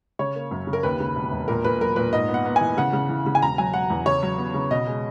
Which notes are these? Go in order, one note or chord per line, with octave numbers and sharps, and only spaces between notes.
C#3 C#5
A#3
F#2
C#3
A#4
D#2 B4
C#3
E1
E1
A#2 A#4
A#2 B4
F#3 A#4
A#2 B4
G#2 D#5
B3
F#5
B3
E3 G#5
C#3 F#5
C#3
E3
C#3
G#5
E1 A#5
F#3 G#5
F#3 F#5
E2
C#3 C#5
F#3
B3
C#3
B2 D#5
G#3